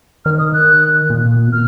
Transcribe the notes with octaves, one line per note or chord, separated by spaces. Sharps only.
D#3 F6
D#6
F#6
A#2
B2
A#2 F6